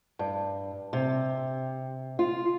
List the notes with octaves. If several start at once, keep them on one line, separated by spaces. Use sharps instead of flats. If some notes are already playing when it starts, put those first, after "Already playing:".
G2
C3
F4